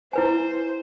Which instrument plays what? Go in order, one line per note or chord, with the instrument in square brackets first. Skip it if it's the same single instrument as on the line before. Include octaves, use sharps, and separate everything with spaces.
[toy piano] E4 B4 G#5 [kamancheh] C5